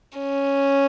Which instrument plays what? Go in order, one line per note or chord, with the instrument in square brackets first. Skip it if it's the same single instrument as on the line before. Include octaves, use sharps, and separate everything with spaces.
[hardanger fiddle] C#4